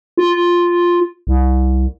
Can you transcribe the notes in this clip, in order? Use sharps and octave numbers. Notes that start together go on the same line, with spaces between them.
F4
C2